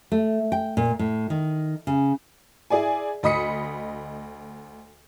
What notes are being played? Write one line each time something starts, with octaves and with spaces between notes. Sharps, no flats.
A3
G5
A#2
A2
D#3
C#3
E4 G#4 D5 G#5
D2 D#5 B5 D#6 B6 C#7